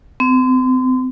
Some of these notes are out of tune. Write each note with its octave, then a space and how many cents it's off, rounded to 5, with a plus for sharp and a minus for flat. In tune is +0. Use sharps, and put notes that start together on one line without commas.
C4 -35